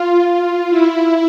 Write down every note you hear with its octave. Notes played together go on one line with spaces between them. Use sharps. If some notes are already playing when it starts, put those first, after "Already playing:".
Already playing: F4
F4
E4